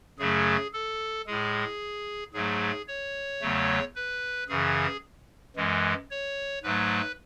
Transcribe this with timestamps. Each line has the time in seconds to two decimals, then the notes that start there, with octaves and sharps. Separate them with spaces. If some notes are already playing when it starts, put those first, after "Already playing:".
0.19 F#2 C#3 F#3 A3 G#4
0.73 A4
1.27 A2 G#3 G#4
2.33 G#2 F#3 A3 G#4
2.88 C#5
3.41 E2 C#3 F#3 A3
3.95 B4
4.48 F#2 C#3 E3 G#4
5.56 F#2 E3 G#3
6.11 C#5
6.63 G#2 F#3 A3 B4